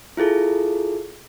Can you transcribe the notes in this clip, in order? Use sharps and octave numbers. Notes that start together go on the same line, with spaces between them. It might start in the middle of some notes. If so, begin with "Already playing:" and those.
E4 F4 G#4 A4